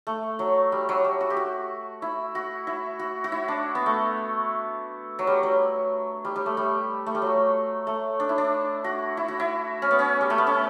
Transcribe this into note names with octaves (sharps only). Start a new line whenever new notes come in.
A3
F#3
G3
F#3
G3
F#4
G4
F#4
E4
F#4
E4
F#4
F#4
E4
D4
B3
A3
F#3
G3
F#3
G3
G3
A3
G3
A3
G3
F#3
A3
D4
E4
D4
F#4
E4
F#4
E4
C#4
B3
C#4
G3
A3
B3
C#4